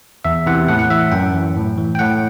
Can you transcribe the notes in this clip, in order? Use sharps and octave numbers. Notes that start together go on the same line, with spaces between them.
E2 E5
C3 E3 F#5
A2 F#5
F#5
E3 E5
F#2 G5
E3
A2
E3
G5
A2 F#5